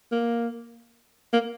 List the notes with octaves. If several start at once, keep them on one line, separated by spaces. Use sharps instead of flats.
A#3
A#3